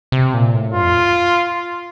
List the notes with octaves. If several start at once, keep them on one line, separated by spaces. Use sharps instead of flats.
C3
A#2
A2
G2 F4
F2